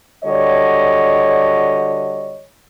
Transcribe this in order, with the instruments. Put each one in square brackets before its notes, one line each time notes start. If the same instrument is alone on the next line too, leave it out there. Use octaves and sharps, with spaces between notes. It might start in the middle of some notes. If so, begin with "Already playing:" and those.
[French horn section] D3 G3 F#4 C#5 D#5